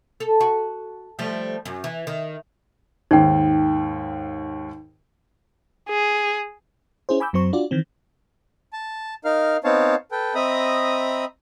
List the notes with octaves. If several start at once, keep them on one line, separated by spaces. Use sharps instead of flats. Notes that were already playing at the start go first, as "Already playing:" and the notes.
A4
F#4
F3 G3 A3
F#2
E3
D#3
D#2 G#2 D#4 G5
G#4
C#4 E4 G#4 C5
G#5 B5 D6 E6 G6
F#2 F#3 C4 C5 C#6
D4 F4 F#4 D5
D#3 E3 C4
A5
D#4 A#4 F5 F6
B3 C4 D#4 C#5 F5 A5
A4 B4 G5
C4 D#5 E5 A#5 B5 D#6